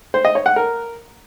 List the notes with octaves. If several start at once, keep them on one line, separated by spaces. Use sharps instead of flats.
C5
D#5
C#5
F#5
A#4